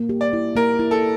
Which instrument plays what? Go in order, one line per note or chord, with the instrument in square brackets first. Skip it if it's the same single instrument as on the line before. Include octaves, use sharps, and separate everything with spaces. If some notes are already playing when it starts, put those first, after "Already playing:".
Already playing: [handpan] A#3
G4
[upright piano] D5
[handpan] E4
[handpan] A#3 [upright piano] A#4
[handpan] E4
[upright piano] A4